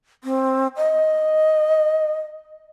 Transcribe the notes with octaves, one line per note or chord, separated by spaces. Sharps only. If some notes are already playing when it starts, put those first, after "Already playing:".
C4
D#5